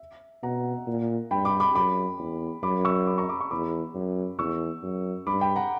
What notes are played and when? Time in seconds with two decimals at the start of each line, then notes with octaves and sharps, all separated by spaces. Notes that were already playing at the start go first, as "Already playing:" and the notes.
Already playing: E5
0.43 B2 F#5 A#5
0.87 A#2
1.31 G2 G5 B5
1.45 B5 D6
1.60 B5 D6
1.75 F#2 B5 D6
2.19 E2
2.63 F#2 B5 D6
2.85 C#6 E6
3.07 B5 D6
3.18 A#5 C#6
3.29 B5 D6
3.40 A#5 C#6
3.51 E2 B5 D6
3.95 F#2
4.39 E2 C#6 E6
4.83 F#2
5.27 G2 B5 D6
5.41 G5 B5
5.56 F#5 A#5